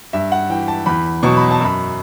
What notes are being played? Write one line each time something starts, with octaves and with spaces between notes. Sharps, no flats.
G2 E5
F#5
E3 G5
A5
E2 B5
B2 F#3 C#6
B5
A5
F#2 B5